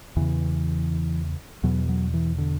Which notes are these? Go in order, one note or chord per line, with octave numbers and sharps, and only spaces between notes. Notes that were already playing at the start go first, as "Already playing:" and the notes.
E2 C#3 E3
E2 B2 F#3
F#3
E3
D3